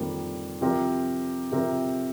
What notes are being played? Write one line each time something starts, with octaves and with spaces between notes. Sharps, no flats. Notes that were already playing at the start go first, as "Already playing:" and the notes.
Already playing: F2 D#3 G3 A#3 F4
C3 F3 C4 G4 A#4
C3 F3 C4 G4 A#4